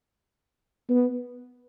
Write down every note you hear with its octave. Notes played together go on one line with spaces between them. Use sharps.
B3